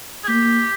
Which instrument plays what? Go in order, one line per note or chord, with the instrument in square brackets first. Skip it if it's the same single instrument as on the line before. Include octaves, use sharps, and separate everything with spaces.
[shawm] G#4
[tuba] A#3 [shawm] G4